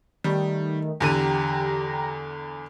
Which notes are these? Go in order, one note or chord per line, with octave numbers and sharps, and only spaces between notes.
D#3 G3 A3
E2 D3 G4 A#5 D#7